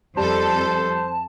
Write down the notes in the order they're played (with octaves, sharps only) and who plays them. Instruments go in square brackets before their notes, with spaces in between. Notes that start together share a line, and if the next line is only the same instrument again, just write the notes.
[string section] F2 A4 [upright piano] G3 [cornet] C5 [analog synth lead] A5